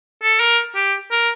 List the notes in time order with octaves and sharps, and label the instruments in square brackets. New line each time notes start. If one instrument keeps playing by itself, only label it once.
[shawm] A4
A#4
G4
A#4